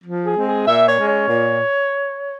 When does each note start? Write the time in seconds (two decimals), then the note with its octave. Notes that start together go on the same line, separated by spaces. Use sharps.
0.03 F3
0.24 G#4
0.34 G#3 C4
0.45 G#4
0.66 A#2 E5
0.87 C#5
0.97 G#3 C#4
1.07 C#5
1.29 A#2